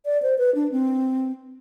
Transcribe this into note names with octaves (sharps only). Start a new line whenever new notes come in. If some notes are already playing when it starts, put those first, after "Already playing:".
D5
C5
B4
D4
C4